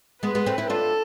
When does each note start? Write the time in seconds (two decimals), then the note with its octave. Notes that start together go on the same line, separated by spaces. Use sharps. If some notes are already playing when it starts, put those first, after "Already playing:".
0.23 G#3 B3 B4
0.35 G#3 B3
0.46 A3 C4
0.58 C4 E4
0.69 D4 F4 A4